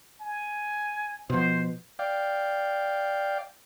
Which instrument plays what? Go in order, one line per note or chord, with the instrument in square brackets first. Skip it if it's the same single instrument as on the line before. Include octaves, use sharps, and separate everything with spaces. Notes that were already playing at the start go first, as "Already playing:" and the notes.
[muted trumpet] G#5
[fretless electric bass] B2 F3 [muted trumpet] C5
[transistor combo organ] D5 F5 G5